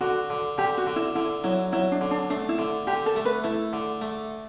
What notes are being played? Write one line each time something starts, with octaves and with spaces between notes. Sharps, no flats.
D3 F#4
D3
D3 G4
F#4
D3
E4
D3 E4
F#3 E4
F#3 E4
D4
D3
D4
A3 D4
E4
D3
D3 G4
A4
A3
B4
A3 E4
D3
A3